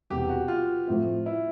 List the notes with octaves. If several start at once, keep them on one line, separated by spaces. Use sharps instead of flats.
E1 E2 C3 G4
F#4
F4
A2 F3 A3 C4
E4